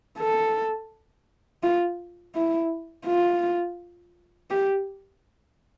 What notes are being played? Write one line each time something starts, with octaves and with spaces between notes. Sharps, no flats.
A4
F4
E4
F4
G4